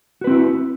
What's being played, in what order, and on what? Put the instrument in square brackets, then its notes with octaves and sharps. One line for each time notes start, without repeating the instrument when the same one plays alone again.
[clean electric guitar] F#4
B4
C4
E4